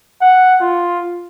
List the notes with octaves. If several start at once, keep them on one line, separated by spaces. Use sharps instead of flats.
F#5
F4